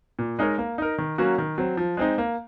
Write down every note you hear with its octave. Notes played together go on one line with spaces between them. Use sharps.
A#2
G#3 D#4 A#4 C#5
A#3
D#4 A#4
D#3
F#3 A#3 C#4 F#4
D#3
F#3 C4
F3
G#3 C4 D#4
A#3